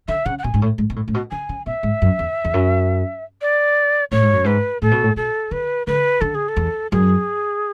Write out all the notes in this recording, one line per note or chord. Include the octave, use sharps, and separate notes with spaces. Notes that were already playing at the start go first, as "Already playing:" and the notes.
D3 E5
C#3 F#5
F#5
B2 G#5
G#2
A2
G#2
B2
A2
A2
B2
D3 G#5
C#3
B2 E5
G#2
F#2
E2
E2
F#2
D5
A2 C#5
G#2
F#2
G#2 B4
A2 A4
B2
A2
B2 A4
D3 B4
D3 B4
D3 A4
G#4
A4
E2
F#2 G#4